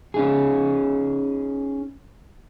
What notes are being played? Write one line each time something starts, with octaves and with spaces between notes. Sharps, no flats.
C#4 D#4 G#4